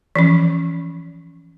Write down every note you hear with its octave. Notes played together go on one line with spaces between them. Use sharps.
E3 F3 C#4